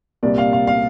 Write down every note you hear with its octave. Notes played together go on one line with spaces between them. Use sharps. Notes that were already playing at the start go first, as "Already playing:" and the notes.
C2 A#2 G3 A#3 D5
F5
F5
F5